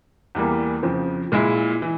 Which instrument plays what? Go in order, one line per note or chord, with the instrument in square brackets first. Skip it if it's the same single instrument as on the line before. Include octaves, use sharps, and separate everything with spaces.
[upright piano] E2 E3 G3 A#3
F2 C#3 F3 C4
A#2 G#3 E4
E3